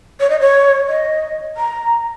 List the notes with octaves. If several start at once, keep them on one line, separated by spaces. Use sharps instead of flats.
C#5
D#5
C#5
D#5
A#5